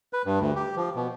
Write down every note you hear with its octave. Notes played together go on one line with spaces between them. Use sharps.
B4
G2
D2
G4
F3
B2